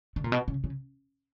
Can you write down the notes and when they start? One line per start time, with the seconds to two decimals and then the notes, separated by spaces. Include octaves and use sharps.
0.16 D3
0.24 A#2
0.32 B2
0.48 C#3
0.64 C#3